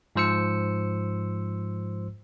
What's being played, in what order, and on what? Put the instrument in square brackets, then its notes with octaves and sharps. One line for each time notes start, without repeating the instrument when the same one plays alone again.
[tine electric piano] G#2 F3 C5 E6 C#7